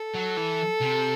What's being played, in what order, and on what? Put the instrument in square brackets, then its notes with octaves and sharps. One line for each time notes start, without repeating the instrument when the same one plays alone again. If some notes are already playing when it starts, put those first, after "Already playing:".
Already playing: [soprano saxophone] A4
[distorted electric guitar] F#3
E3
C3